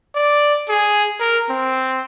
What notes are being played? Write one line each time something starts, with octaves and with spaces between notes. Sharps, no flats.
D5
G#4
A#4
C4